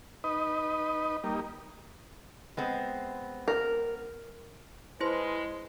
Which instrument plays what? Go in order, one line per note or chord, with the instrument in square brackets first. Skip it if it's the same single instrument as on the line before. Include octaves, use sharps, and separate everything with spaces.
[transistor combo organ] D#4 B4 D#5
G3 A#3 D#4
[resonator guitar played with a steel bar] G#3 B3 C4
[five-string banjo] A#4
[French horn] G#3 [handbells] E4 C5 C6 [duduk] B4